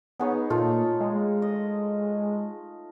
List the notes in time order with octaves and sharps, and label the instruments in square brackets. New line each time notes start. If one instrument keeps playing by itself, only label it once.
[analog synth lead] B3 [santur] D#4 G#4 C#5
[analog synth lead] A#2 [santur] A3 F4
[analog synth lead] G#3
[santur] D#5